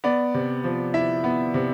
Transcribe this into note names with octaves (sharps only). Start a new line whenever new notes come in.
B3 D5
C3
F3
E4 E5
B3
C3